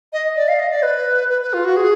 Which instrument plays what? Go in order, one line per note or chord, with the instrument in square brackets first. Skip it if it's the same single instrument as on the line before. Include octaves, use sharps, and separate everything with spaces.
[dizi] D#5
D5
F5
D#5
D5
B4
B4
B4
F4
F#4
G#4